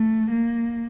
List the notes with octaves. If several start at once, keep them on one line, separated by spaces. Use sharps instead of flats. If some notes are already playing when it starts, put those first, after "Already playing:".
Already playing: A3
A#3